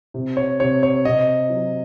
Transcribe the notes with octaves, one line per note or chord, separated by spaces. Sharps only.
C3
C#5
C3 C#5
C#5
C3 D#5
F#3